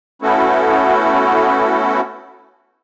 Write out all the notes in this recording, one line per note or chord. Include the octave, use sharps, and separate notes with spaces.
A3 B3 C#4 E4 F#4 A4